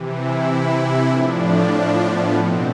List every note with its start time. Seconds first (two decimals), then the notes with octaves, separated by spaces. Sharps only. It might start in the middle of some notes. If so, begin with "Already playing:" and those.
Already playing: C3 E3
0.14 E4
1.07 A2 F3 D4
2.02 B3
2.33 B2 C4